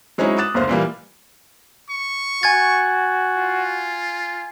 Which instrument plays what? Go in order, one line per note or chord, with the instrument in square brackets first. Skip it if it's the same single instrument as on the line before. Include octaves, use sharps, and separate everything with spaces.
[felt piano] F#3 G#3 C4 C#4 D#4 E4
D6 D#6 F#6 A6 E7
F#1 D2 A#3 C5
A#2 E3 G3 A#3
[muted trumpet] C#6
[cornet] F#4 [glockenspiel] G#5 G#6 A6
[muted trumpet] F4